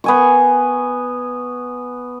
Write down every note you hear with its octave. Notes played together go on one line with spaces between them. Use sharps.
B3 G#5 C#6